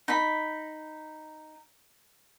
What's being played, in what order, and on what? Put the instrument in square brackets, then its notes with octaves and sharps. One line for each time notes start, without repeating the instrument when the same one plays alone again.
[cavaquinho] D#4 B5